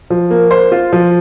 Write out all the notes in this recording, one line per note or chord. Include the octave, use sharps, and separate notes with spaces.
F3
A#3
C5
F4
F3